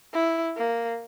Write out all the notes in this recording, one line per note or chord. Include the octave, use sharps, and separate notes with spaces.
E4
A#3